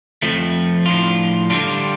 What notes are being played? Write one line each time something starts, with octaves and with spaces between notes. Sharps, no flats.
F2 F3 A3
A2 F3 D4 F4
D3 G3 D4 F4